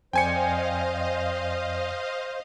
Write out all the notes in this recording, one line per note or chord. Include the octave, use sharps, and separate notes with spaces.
F2 C5 D5 D#5 F5 G5 G#5 C#7